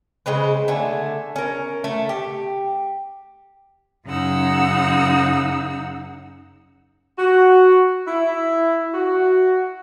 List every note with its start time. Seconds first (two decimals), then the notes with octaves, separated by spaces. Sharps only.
0.26 C#3 G#3 C4 B4
0.68 D3 A3 G#5
1.36 C#4 A#4
1.84 A3
2.09 G4
4.06 F#2 C#3 D#4 F#5 E6
7.18 F#4
8.07 E4
8.93 F#4